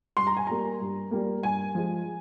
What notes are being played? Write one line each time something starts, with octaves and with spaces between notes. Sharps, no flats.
G2 C6
A#5
G#5
G3 A#3 A#5
G2
G3 A#3
G2 G#5
F3 G#3